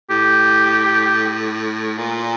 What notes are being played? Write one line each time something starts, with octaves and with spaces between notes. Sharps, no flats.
A2 G4
A#2